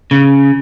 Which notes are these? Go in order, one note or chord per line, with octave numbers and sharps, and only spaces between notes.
C#3